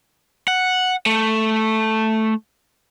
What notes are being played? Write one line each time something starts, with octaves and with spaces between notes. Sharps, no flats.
F#5
A3